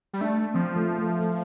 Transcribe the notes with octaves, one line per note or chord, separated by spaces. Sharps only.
G3
A3 D4
F3 C4
A3
A3
A3